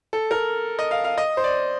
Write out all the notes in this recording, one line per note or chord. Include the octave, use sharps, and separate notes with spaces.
A4
A#4
D#5
F5
F5
D#5
C5
D5